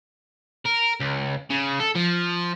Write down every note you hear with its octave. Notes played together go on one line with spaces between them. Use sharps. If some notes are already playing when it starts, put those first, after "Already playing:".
A#4
C#2
C#3
A4
F3